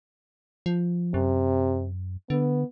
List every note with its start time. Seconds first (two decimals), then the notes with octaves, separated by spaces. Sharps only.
0.66 F3
1.14 F#2 C3
2.30 D3 B3